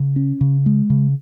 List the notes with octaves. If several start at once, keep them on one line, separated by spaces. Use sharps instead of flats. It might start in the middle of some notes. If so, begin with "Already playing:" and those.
Already playing: C#3
C#4
C#3
G#3
C#3